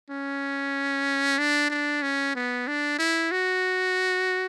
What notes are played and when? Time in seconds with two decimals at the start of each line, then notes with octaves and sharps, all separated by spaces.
0.10 C#4
1.38 D4
1.70 D4
2.02 C#4
2.35 B3
2.67 D4
2.98 E4
3.31 F#4